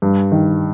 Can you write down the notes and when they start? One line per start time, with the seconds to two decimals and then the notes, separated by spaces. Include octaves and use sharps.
0.02 G2
0.32 D#3